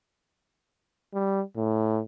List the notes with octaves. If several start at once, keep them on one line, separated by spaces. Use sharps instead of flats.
G3
A2